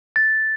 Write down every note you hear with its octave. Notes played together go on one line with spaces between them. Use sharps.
A6